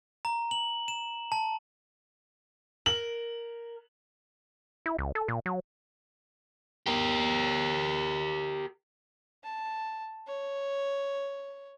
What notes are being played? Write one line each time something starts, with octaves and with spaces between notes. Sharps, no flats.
A#5
F#7
E7
A5
A#4 F#7
E4
C#2
A4
A#2
F#3
G4 A#4
A5
C#5